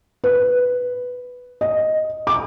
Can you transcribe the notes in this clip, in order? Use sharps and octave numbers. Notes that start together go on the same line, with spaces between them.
B4
D#5
D6